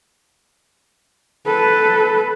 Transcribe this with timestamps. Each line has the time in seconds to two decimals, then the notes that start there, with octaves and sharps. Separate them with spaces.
1.47 A4 B4